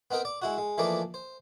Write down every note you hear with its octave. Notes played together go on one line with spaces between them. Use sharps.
B3 C4 D#4 A#4 G5
D5
G#3 E4 F#4
G#3
E3 F3 A3 A#3 D#4 D5
C5